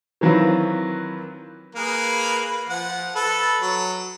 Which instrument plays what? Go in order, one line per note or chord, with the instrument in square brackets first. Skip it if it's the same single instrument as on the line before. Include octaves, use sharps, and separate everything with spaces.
[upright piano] D#3 E3 F#3 C4 F4 B4
[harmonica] A#3 G#4 B4
F3 F#5
A4 B4
F#3